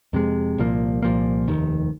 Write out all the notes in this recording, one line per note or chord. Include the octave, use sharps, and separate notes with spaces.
F2 C3 G#3
C2 A#2 F3 A#3
C2 A#2 F3 A#3
F1 D#2 D#3